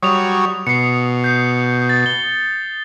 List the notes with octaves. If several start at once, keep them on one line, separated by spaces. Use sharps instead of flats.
F#3 G3 C#5 D#6 F7
B2 C7 C#7
G6 C7
A6
G7